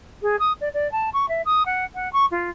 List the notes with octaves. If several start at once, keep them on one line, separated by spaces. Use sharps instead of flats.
G#4
D#6
D5
D5
A5
C#6
E5
D#6
F#5
F#5
C#6
F4